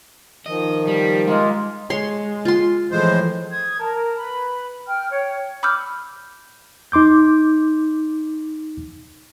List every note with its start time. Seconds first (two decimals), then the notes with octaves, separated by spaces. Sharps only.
0.46 D#3 F3 D#5
0.87 G3
1.27 G#3 A#3 F4 D#5
1.90 G#3 C#5 C6
2.45 F4 C6
2.91 A2 E3 F3 G#3 C5
3.51 D#6 G#6
3.80 A#4 A5
4.16 B4 B5
4.86 G5 F6
5.10 C#5 G5
5.63 B5 D6 E6 F6 G6
6.92 D#4 C6 D6 G6